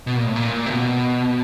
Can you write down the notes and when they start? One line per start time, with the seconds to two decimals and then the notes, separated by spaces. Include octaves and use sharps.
0.07 B2
0.17 A#2
0.27 A2
0.36 A#2
0.66 C3
0.70 B2